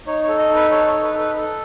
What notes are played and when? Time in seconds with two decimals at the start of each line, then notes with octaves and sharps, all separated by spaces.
0.07 D#4 C#5
0.23 A4 C#5
0.39 D#5
0.49 D#4
0.55 B4
0.71 A4 C#5
0.88 D#4 C#5
1.03 B4
1.14 A4
1.20 B4
1.36 A4